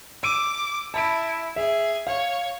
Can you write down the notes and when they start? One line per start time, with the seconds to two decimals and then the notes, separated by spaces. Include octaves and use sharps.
0.23 D6 E6 D7 D#7
0.94 E4 A5 B5 D7
1.56 G#4 E5
2.07 C#5 F5